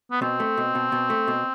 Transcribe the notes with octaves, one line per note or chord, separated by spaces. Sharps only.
B3
B2 C4
A3
B2
B2
B2
A3
B2